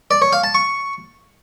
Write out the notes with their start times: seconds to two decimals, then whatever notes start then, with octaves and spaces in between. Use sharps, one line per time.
0.11 D5
0.22 C#5
0.33 F5
0.44 A5
0.55 C#6